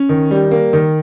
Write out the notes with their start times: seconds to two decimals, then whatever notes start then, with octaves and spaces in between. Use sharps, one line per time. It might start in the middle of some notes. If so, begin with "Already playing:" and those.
Already playing: C#4
0.09 D#3
0.31 G3
0.51 A#3
0.73 D#3